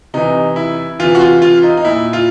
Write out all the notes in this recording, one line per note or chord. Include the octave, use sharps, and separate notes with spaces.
C3 E3 D#4
E4
C3 E3 F4
F#4
F4
F4
D#4
D#4
A#2 E4
F4